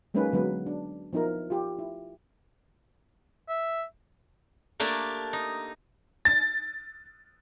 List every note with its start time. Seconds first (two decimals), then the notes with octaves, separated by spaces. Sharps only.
0.14 F#3 G#3 A#3 C#4 D#4 B4
0.33 D3 F#3 G#3 B3 B4
0.66 D4
1.13 F3 B3 D#4 E4 A#4
1.50 F4 G4
1.79 E4
3.49 E5
4.80 A3 A#3 D4 G4
5.33 D#4
6.25 A6